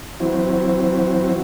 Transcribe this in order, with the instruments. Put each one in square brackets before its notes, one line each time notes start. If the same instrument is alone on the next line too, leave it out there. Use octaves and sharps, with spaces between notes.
[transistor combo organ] E3 F#3 C4